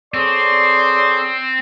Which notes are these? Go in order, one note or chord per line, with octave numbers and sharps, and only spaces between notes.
C4 G#4 A4 C#5 D5 C6